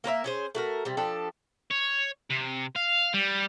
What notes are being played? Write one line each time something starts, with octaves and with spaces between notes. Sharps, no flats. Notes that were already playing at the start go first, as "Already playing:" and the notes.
A#3 A#4 C5 E5
C#4 G#4 C5
A3 F#4 A#4
C3 G3
F3 D4 G4 A4
C#5
C3
F5
G3